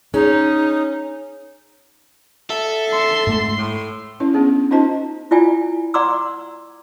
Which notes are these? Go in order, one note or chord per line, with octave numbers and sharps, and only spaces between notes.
C#4 D#4 G#4
A4 E5
C6
G#2 A3
A2
C#4 E4 C#5
B3 C#4 D4 G#4
C#4 D#4 F4 C5 D#5 A5
E4 F4 D5 G5 G#5
D5 F#5 A#5 C6 D6 E6